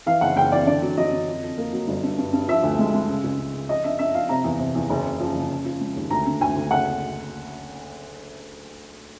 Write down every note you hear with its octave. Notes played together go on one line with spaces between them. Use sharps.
E3 F5
F#1 F#5
F#1 G5
E3 D5
D3 D5
F#3
F#3 D#5
D3
F2
F2
A#3
F#3
G1
G2
G2
G2
F3 E5
D2
G#3
G#3
C#3
C#2
C#3
C#3
F3 D#5
D4 E5
D4 E5
F3 F5
C3 A#5
E2
C3
E2
F#1
C#3
F3
F#1
C#3
F3
G#3
D#2
D2 A#5
D3
D2 G#5
D2
F#1 F#5